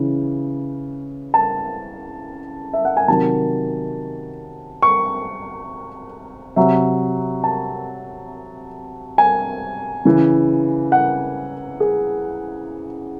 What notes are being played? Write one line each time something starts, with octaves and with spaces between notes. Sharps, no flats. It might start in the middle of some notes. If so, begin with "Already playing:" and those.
Already playing: C#3 E3
A5
E5
F#5
G#5
C3 D#3 F#3 A5
C#6
C3 F#3 E5
A5
G#5
C#3 E3
F#5
G#4